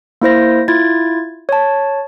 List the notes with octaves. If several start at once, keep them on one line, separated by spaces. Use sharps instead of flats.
A#3 E4 C5 A#6
E4 F4 G#6 A6
C#5 A5